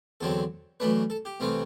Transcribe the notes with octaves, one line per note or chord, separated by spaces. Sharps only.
E2 D3 F#3 C4 A4
F#2 E3 A3 D4 B4
A4
G4
C2 C3 E3 A3 C4